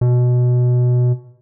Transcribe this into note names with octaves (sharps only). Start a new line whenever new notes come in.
B2